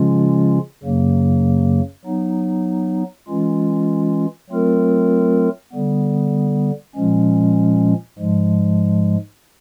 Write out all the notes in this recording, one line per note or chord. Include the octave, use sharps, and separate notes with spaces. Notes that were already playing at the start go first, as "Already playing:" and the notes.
Already playing: C#3 F3 G#3 C#4 F4
F#2 C#3 F#3 A#3
F#3 B3 D#4
E3 G#3 C#4 F4
F#3 A3 C4 F4 A#4
D3 G3 B3
A#2 F3 G#3 C#4
G#2 F3 G#3